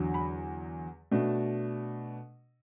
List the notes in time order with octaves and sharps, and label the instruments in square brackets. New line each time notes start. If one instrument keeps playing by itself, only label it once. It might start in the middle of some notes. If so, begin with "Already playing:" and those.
Already playing: [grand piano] E2 D3 F#3
B5
B2 A3 D4